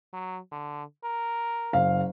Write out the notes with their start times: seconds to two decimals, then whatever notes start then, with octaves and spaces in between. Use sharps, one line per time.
0.13 F#3
0.52 D3
1.04 A#4
1.73 F#1 F5